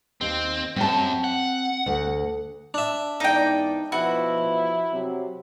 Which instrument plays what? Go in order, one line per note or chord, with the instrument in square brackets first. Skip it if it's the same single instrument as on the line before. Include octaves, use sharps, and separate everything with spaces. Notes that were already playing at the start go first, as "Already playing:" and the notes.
[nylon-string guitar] D#2 [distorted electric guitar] C4
[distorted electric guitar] F#2 [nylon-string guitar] C4 A5
[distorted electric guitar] F#5
[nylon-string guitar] D2
[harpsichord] D4 E5
[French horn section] E2 G#2 D5 [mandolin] D#4 G5
[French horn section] B2 F3 B4 [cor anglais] E4 [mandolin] F#4
[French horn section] C3 F#3 C4